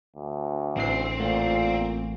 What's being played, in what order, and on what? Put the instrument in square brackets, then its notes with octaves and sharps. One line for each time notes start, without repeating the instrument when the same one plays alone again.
[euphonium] D2
[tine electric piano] A1 E3 C7 [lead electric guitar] C4
[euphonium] A#2 [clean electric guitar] A3 A4 F#5